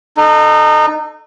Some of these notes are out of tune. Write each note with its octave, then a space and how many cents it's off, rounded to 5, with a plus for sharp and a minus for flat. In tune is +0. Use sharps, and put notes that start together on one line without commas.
D#4 -25 A4 +0